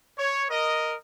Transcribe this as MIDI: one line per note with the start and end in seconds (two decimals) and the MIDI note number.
0.18 0.44 73
0.50 0.95 70
0.50 0.95 75